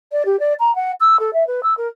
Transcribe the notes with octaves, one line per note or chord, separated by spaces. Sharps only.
D5
G4
D5
A#5
F#5
E6
A4
E5
B4
E6
A#4